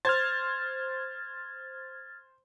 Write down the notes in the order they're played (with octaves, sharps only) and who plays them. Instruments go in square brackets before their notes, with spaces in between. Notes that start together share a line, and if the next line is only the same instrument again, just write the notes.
[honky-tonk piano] C5 [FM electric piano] F6 G#6 A6